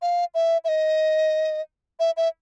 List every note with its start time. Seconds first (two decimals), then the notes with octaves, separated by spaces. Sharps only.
0.02 F5
0.34 E5
0.64 E5
0.68 D#5
1.99 E5
2.17 E5